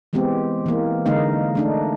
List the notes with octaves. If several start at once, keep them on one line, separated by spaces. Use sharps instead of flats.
E3 G#3 B3 C4 G4
E3 A#3
D3 G#3 A#3 D#4 F5
A3 D4 D#4